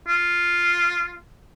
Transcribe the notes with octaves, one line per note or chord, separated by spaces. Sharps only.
F4